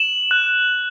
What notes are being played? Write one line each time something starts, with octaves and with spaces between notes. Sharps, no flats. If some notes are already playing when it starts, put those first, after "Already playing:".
Already playing: E7 F#7
F#6